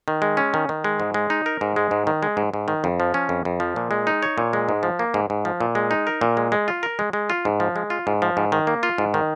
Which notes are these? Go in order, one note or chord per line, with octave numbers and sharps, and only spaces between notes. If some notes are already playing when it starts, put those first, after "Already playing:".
D#3
G#3
C#4
D#3
D#3
G#3
G#2
G#3
D#4
A#4
G#2
G#3
G#2
D#3
G#3
G#2
G#2
D#3
F2
F3
C#4
F2
F2
F3
A#2
G#3
D#4
C#5
A#2
G#3
G#2
F3
A#3
G#2
G#2
F3
A#2
G#3
D#4
A#4
A#2
G#3
G#3
F4
A#4
G#3
G#3
F4
G#2
F3
G#3
F4
G#2
F3
G#2
D#3
A#3
F4
G#2
D#3